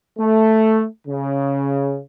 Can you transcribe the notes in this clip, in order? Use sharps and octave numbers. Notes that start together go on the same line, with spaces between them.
A3
C#3